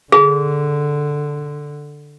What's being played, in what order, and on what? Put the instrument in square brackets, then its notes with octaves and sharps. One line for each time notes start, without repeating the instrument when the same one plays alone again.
[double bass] D3 [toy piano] G#4